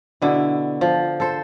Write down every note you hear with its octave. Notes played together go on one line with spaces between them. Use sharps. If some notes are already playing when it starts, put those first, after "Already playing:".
B2 D3 E4
F3
A4 C5